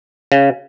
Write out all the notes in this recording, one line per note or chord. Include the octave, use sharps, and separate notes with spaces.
C#3